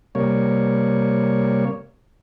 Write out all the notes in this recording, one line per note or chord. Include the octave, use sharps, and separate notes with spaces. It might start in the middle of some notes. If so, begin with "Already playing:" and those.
C3 G3 A#3 C#5